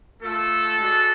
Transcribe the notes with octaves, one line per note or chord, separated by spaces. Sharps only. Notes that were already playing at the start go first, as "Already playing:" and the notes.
A3 F4 A4
G#3 D4 F#4